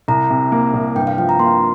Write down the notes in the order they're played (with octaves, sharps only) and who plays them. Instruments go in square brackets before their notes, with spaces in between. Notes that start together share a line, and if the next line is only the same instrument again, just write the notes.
[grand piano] C2 [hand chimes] A#5
[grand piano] C3
A#3
C2
[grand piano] G2 [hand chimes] G5
[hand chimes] F5
[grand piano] F3 [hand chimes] G5
[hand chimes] A#5
[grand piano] A#3 [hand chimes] C6